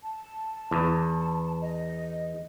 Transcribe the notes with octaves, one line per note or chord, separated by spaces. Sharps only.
A5
E2
D#5